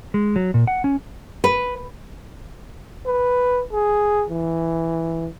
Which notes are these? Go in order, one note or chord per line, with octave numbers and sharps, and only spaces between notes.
G#3
F#3
A#2
F#5
C#4
B4
B4
G#4
E3